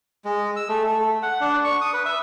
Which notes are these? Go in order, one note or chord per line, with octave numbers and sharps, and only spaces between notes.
G#3
E6
A3
A3
F#5
D4
C#6
D#6
B4
E5